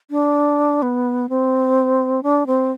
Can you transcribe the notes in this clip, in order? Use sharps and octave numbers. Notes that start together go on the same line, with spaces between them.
D4
B3
C4
D4
C4